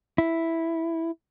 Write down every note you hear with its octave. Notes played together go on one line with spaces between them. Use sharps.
E4